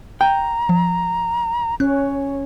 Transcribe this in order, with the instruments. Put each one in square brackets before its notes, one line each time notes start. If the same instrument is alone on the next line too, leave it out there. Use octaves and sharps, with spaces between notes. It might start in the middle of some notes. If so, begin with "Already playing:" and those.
[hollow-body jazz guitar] G5 [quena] A#5
[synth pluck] F3
[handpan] C#4 [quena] C#5 [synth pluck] F#6